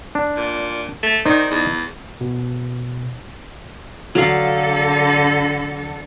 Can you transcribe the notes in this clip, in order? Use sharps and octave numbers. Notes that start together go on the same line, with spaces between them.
D4
A#2
A3
D#3 D#4 C5 D5
E2
B2
D3 F#3 A4 F5